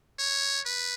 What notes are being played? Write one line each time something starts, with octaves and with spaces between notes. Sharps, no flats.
C#5
B4